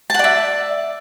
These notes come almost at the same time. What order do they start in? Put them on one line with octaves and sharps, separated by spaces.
A5 F#5 D5 E5